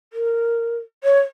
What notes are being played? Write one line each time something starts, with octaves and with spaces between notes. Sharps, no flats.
A#4
C#5